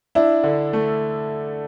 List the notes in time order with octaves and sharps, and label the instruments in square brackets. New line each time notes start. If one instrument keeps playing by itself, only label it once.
[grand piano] D4 [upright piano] E4
[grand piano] D3
A3